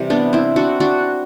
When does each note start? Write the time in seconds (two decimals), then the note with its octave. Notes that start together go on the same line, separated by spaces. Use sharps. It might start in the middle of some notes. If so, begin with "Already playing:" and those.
Already playing: C3 E3 G3
0.10 B3 D4
0.33 C4 E4
0.56 D4 F#4
0.80 D4 F#4